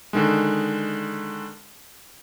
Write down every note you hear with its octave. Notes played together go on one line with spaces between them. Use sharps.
D3 D#3 G#3